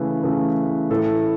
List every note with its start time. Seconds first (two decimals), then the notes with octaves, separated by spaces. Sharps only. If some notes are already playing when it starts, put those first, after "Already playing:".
Already playing: C#3 E3 A3 B4
0.23 C#3 E3 A3
0.90 A2 E3 A3 A4